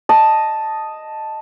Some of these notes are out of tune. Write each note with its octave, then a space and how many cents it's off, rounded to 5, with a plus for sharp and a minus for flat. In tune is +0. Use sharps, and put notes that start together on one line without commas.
D#5 +0 A5 +0